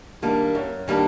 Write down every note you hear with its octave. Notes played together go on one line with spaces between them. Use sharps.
D#3 G3 A#3 D4
F#2
D#3 G3 A#3 D4